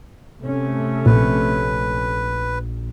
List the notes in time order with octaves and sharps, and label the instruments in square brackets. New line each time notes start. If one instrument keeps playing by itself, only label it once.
[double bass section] C3 A3 C#4
[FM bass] A#1 [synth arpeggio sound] A#2 [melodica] B4